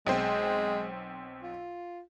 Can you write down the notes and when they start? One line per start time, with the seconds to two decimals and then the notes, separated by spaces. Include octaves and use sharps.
0.07 B1 G#3 C4 C5
1.43 F4